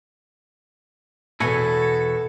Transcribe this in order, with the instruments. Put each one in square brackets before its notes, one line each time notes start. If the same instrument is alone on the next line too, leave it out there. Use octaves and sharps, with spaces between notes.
[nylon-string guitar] E2 B2 G#5 [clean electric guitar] E4 F#4 C#5 [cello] A4